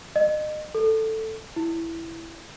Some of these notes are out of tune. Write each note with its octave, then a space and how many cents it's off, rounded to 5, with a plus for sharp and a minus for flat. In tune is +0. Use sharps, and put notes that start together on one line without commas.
D#5 -30
A4 +5
E4 +5